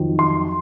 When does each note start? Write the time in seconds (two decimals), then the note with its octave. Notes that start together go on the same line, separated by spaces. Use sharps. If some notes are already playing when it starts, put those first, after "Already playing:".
Already playing: F2 D#3 F#3
0.19 C6